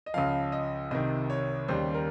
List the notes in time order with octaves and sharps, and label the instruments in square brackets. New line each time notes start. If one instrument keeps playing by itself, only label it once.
[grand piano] D#5
C#2 C#3 F3 F5
D#5
C2 C3 D#3 D#5
C#5
D#2 C#3 G3 C5
A#4